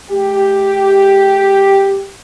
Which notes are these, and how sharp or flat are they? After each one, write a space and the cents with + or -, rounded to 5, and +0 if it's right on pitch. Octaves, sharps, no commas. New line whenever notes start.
A3 -45 G4 +0